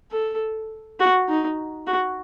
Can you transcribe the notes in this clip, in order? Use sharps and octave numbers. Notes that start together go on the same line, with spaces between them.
A4
F#4
D#4
F#4